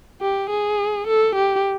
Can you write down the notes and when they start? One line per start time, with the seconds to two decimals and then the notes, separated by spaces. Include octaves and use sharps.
0.21 G4
0.50 G#4
1.07 A4
1.35 G4